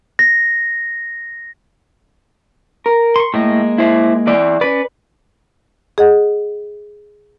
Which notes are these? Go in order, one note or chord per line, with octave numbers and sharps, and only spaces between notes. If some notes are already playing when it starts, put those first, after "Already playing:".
A#6
A#4
C6 C#6
A2 G#3 A#3 D#5
E4 C5
E3 D5
C#4 B4 D5
G#4 D#5 F#5